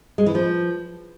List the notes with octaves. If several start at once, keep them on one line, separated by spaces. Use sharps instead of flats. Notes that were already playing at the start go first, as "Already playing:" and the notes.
G#3
E3
F3